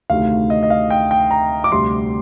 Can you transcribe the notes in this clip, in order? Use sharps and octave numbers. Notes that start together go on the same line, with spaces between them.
D2 C3 D#3 A3 F5
D#5
D#5
F5
G5
G5
A#5
D6
D2 C3 G3 C6